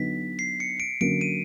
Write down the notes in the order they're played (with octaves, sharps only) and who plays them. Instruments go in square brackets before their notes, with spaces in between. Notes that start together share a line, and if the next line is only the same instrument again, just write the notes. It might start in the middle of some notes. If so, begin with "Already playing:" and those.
Already playing: [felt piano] D3 F#3 B3 D#4 [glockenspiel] B6
[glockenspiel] C7
C#7
D7
[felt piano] D3 F#3 A#3 C#4 [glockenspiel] D7
[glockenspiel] D#7